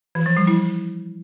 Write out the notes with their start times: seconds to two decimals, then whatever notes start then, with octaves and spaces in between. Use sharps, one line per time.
0.15 E3
0.26 F3
0.37 G3
0.47 E4